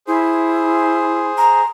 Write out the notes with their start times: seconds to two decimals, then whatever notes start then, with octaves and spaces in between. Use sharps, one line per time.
0.08 E4 G#4 C5
1.38 A#5